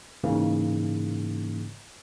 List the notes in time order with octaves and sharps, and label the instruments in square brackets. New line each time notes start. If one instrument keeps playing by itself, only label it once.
[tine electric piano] G#2 C#3 E3 A#3